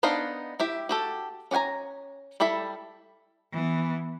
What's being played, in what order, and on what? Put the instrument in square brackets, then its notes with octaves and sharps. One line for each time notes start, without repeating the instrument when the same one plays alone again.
[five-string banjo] B3 D4 D#4 C5 F5
E4 G4 E5
F#4 G4 A4
C#4 D5 F#5 G#5 A#5
G3 E4 A4 E5 B5
[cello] E3 B3